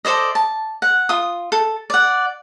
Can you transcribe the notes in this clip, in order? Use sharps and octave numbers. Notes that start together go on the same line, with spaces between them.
A4 C5 D5 D#5
A5
F#5
F4 D#6
A4
D5 F#5